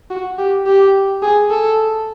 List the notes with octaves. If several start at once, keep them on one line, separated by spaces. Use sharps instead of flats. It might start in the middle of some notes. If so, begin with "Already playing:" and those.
F#4
G4
G4
G#4
A4